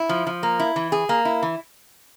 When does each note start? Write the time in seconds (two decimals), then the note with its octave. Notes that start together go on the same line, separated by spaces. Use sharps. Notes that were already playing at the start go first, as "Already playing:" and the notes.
Already playing: E4
0.09 F3
0.27 F3
0.43 A#3
0.59 E4
0.76 E3
0.92 G#4
1.09 A#3
1.25 E4
1.42 E3